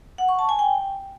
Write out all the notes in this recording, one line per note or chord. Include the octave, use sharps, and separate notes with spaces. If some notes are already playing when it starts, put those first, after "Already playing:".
F#5
C#6
A5
G#5
G5